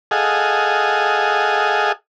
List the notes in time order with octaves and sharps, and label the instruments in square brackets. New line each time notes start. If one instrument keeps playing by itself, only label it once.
[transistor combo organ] G#4 A4 D#5 F5 F#5 G#5